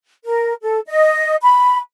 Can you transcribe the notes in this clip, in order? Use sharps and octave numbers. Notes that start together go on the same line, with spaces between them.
A#4
A4
D#5
B5